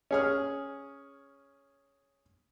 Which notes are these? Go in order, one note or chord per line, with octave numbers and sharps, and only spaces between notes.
C#4 G#4 F6